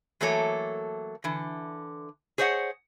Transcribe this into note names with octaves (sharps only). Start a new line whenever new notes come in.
E3 F#3 A3 A#3 A4 C#5
D3 E3
G#4 C5 C#5 D#5 F#5